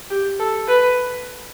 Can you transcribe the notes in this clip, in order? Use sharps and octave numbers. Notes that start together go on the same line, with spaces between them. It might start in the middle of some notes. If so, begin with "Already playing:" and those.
G4
A4
B4